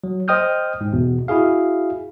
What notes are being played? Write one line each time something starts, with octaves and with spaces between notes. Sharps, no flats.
F#3
C5 D#5 G5 D#6 F6 G6
G#2
E2 B2
E4 F#4 G#4 F5